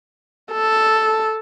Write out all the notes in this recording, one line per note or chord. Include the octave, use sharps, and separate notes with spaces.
A4